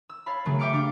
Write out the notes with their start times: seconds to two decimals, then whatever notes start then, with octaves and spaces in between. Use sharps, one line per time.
0.09 E6
0.26 C#5 F5 A5 B5
0.45 C#3 F#3 A3 A#3
0.59 E5 G5 D6 F6 C#7 D7
0.73 D4 G4 F5 D6